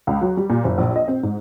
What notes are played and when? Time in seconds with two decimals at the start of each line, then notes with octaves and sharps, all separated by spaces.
0.07 C#2
0.21 F#3
0.37 G3
0.50 A#2
0.64 F#1
0.78 A#1
0.96 D#5
1.08 C4
1.23 G#2